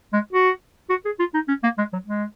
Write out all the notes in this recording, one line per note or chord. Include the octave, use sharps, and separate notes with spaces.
G#3
F#4
F#4
G#4
F4
D#4
C#4
A#3
G#3
F#3
G#3